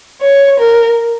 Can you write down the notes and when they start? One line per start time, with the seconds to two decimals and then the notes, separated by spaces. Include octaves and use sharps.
0.22 C#5
0.59 A#4